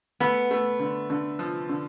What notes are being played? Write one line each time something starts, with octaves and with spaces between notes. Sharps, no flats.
A3 B3
A3
D3
D3
F3
D3